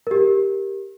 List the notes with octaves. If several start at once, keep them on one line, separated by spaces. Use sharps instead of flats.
G4 A#4